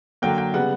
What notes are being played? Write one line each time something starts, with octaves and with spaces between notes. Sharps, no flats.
D3 F#3 A#3 G5
G5
C#3 G3 B3 F#5